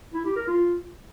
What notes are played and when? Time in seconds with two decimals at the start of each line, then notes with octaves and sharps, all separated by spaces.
0.14 E4
0.25 G4
0.36 A#4
0.47 F4